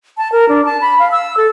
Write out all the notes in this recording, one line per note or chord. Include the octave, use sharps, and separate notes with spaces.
A5
A#4
D4
A5
B5
F5
E6
A4